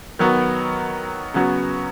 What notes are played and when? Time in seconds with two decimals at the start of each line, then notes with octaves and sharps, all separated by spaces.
0.19 D#3 F#3 B3 F#4
1.34 C#3 F#3 B3 F#4